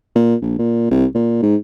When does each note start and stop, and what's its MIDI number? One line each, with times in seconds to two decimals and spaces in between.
0.15 0.35 46
0.42 0.54 34
0.59 0.91 46
0.91 1.06 36
1.15 1.39 46
1.43 1.56 44